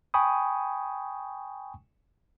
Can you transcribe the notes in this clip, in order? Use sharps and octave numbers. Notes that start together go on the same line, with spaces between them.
G5 G#5 B5 C#6 D#6